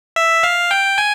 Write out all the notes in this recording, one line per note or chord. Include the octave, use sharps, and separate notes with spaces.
E5
F5
G5
G#5